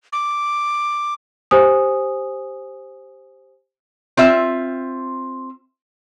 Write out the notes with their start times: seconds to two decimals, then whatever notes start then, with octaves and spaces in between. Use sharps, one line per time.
0.13 D6
1.51 G4 C5 G#5 D#6
4.17 C4 F4 E5